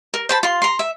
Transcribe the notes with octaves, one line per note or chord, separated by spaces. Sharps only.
A#4
C5 A5 B5
F4 C6
A#5 C6
E5